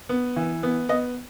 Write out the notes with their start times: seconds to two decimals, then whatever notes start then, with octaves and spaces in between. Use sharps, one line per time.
0.09 B3
0.36 E3
0.63 B3
0.89 B3 D#5